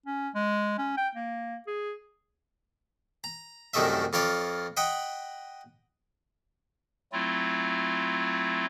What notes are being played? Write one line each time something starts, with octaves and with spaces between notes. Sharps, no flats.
C#4
G#3
C#4
G5
A#3
G#4
A#5
C2 F#2 D#3 A3 D#5 E5
F2 F4 C#5 D5
D#5 F#5 G5 B5 D#6
F#3 A3 C4 E4 F4